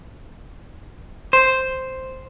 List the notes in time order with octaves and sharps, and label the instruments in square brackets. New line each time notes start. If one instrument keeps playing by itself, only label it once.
[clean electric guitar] C5